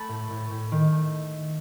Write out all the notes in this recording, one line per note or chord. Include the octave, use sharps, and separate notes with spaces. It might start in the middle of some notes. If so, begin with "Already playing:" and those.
Already playing: A3 A5 B5
A2
A2
A2
D#3
A3